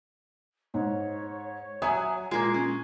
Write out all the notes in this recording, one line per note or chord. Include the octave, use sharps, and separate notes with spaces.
G#2 C#5
F#3 E5 G#5 D#6
A#2 G#3 A#3
C#4